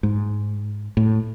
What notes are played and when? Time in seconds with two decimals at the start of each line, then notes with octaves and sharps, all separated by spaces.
0.03 G#2
0.97 A2